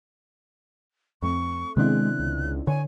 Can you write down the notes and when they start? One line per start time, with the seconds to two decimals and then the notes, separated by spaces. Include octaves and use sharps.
1.22 F2 A3 C4 C#6
1.77 C3 D#3 G#3 B3 C4 D4 E4 F#6
2.20 C#2
2.67 D3 C#5 G#5